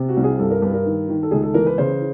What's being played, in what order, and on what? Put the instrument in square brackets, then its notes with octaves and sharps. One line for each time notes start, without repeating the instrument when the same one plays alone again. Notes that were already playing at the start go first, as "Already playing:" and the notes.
Already playing: [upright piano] C3
F#4
C2
G#4
G2 A4
A#4
G2 B4
A#4
D#3
D#3
A4
C#2 G#4
A4
E3 A#4
B4
C#3 C5